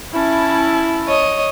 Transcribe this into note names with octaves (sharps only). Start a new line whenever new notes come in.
C#4 E4 A5
C#5 D#5